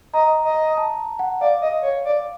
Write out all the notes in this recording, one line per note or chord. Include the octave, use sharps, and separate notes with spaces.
D#5 A#5
D#5
A5
F#5
D5 F5
D#5
C#5
D5